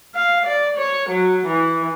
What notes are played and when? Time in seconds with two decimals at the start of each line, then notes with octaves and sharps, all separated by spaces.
0.14 F5
0.46 D5
0.76 C#5
1.09 F#3
1.46 E3